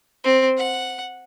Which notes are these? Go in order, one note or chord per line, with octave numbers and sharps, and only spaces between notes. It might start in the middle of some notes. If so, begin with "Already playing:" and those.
C4
F#5